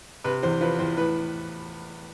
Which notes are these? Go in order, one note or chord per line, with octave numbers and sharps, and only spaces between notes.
C3 B4
E2 C5
F3 B4
E2 C5
A2 B4